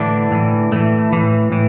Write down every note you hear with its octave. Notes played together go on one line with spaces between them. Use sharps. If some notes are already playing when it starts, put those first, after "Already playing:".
Already playing: A2 D3 E3 D4
A2 E3
A2 E3 A3
A2 E3
A2 E3